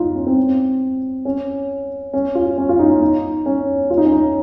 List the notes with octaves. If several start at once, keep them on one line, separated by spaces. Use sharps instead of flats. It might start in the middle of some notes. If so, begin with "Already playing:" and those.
Already playing: D#4 F4
C#4
C4
C#4
C#4
F4
C#4
F4
D#4
D#4
D#4
C#4
F4
D#4
C#4
D#4